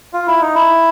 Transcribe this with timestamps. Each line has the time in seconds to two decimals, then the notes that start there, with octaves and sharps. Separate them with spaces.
0.13 F4
0.27 E4
0.41 D#4
0.55 E4